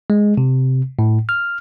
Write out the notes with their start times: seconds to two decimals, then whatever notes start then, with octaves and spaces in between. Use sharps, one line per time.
0.10 G#3
0.38 C3
0.99 A2
1.29 F6